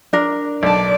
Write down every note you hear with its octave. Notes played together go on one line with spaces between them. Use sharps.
D4 A#4
B1 D5 A5